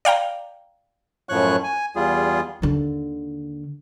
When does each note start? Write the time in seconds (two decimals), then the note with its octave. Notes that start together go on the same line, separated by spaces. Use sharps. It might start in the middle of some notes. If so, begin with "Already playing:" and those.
0.05 D5 F5 G5 A#5
1.29 F#2 A2 F3 C#5 C#6 F#6
1.64 G#5
1.96 E2 G3 F4 G#4
2.62 D#2 D3